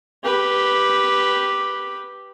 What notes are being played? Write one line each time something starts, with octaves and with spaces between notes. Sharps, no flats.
G4 B4